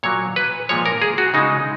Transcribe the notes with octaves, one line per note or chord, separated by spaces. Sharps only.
A#2 F#3 A#3 C#5
B4
A#2 F3 G#3 C#5
A#4
G#4
F#4
C#3 G#3 D#4